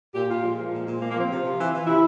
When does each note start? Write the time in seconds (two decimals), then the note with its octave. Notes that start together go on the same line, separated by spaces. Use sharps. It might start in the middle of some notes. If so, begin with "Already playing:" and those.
0.14 A#2 G4
0.29 A#2 F4
0.43 F3 G#3
0.58 F3
0.72 A#2
0.86 A#2
1.00 F3 A#3
1.10 F3 A#3
1.20 C4
1.29 C3 F4
1.43 C3
1.59 E3
1.72 E3
1.86 C3 E4